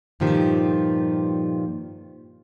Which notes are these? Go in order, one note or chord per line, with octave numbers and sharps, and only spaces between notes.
G2 A#2 D#3 F3 G4